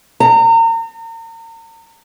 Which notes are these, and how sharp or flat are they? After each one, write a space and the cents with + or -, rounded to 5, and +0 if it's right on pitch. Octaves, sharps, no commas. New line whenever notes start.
A#5 -35